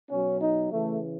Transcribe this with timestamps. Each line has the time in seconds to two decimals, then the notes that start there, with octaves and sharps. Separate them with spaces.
0.11 B2 F#3 C#4
0.41 D#4
0.71 C#3 E3 A3